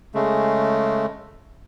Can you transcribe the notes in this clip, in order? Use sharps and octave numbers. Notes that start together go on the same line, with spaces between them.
C#3 G#3 A3